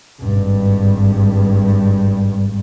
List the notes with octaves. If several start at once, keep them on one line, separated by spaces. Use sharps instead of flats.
G#1 G2